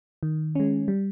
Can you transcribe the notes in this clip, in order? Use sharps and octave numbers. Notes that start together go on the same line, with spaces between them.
D#3
G#3 C#4
G3